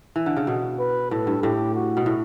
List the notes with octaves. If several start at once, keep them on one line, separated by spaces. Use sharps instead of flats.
E3
D3
C#3
B2
B4
A2 A4
G2
A2 G4
F#4
B2
A2